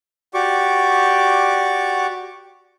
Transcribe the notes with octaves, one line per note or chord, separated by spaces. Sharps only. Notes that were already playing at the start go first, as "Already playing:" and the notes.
F#4 G4 D5 C#6 D6